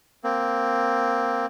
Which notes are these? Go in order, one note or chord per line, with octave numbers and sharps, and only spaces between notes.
A#3 C4